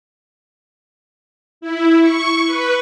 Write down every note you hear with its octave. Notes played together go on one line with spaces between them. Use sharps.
E4
C#6
B4